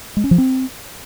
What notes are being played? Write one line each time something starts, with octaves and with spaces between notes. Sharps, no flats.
G#3
C#4
F3
C4